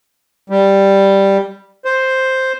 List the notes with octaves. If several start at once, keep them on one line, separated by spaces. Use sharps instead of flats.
G3
C5